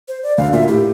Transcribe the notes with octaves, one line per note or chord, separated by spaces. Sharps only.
C5
D5
D2 D3 F5
A#2 E5
A2 G4